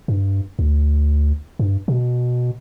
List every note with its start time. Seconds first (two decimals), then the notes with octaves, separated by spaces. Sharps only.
0.08 G2
0.59 D2
1.59 G2
1.88 B2